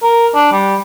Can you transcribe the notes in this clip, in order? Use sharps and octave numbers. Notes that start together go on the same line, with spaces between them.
A#4
D4
G3